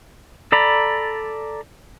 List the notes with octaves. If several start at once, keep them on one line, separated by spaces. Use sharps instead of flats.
A4 D5 A#5 B5